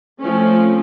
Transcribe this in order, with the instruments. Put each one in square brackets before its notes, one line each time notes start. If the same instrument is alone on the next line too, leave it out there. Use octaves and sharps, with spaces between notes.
[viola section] F3 A3 C4 C#4